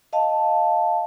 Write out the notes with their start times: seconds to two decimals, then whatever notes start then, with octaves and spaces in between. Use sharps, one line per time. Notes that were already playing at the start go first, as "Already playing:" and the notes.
0.13 D#5 F5 A5